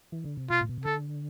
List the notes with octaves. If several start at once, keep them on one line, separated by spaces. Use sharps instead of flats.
E3
D3
C3
B2 F4
A2
B2
C3
D3 A4